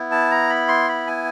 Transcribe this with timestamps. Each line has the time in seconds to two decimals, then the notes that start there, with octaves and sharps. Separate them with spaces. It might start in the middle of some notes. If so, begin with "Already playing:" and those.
Already playing: B3 E4
0.11 A5
0.31 A#5
0.49 B5
0.68 C6
0.88 B5
1.07 G#5